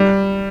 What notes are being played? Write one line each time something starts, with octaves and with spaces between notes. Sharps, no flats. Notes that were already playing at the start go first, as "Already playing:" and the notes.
Already playing: G3